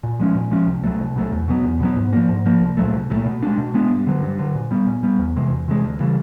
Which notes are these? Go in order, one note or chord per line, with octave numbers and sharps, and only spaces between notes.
A#2
F3 G#3 C#4
A#2
F3 G#3 C#4
C2
B2 F#3 A3
C2
B2 F#3 A3
E2
B2 F#3 B3
E2
B2 F#3 B3
G#2
F3 A#3
G#2
F3 A#3
C2
A#2 F#3 A3
C2
A#2 F#3 A3
B2
G#3 B3 D4
B2
G#3 B3 D4
G2
D3 F#3
G2
D3 F#3
A#2
G3 B3
A#2
G3 B3
E2
C3 E3 G#3
E2
C3 E3 G#3
D2
C#3 E3 G3